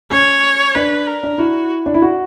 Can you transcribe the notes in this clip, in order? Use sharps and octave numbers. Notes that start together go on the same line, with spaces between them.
C#4 C#5
D4 B4
A#4
D4
E4 F#4
D4
E4
F#4